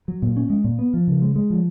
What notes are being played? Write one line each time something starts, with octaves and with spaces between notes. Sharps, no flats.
F#3
A#2
C#4
G#3
A#2
B3
F3
C#3
G#3
G#3
F3